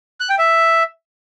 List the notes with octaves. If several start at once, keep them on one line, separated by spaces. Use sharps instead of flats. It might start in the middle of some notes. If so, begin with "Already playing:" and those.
F#6
G5
E5